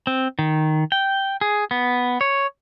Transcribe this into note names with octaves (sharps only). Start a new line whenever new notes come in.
C4
D#3
G5
G#4
B3
C#5